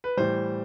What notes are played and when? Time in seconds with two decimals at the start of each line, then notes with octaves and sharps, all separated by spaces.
0.04 B4
0.17 A2 E3 G3 C5